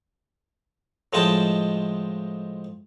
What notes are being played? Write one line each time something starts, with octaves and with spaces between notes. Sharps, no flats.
A2 F3 G#3 D#5 G5 A5